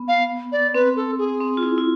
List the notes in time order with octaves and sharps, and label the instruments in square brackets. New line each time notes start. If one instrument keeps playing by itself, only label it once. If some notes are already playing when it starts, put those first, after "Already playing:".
Already playing: [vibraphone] B3
[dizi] F5
D5
[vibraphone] C4 [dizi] B4
[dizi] A4
G#4
[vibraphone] C4
F4
E4
E4